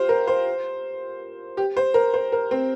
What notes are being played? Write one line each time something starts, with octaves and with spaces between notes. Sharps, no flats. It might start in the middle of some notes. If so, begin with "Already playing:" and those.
Already playing: F4 G4 C5
A#4
C5
G4
C5
A#4
C5
A#4
C4